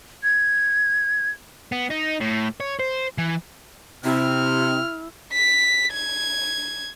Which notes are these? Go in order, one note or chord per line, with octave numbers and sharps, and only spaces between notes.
G#6
B3
D#4
A2
C#5
C5
E3
C3 E4 F6
B6
G#6